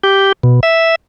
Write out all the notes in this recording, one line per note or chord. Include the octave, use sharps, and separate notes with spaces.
G4
B2
E5